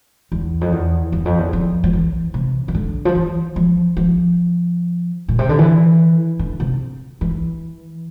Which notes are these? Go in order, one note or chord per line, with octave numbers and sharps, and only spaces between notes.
E2
F2
E2
E2
F2
E2
F2
F3
E3
C3
E3
D3
F3
E3
F3
F3
A#2
C3
D3
E3
D3
C3
E3